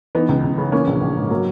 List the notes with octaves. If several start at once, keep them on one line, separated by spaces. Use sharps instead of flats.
E3 B3 D#4
C#2
C#2
C#3
E3 A#3 C#4
A#1
A#1
G#2
F#3 A#3